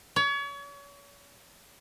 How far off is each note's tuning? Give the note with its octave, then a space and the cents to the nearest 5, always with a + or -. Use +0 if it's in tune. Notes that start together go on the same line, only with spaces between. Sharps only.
C#5 +35